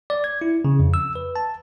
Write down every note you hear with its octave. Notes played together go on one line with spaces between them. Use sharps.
D5
G#6
E4
C#3
F2
E6
B4
A5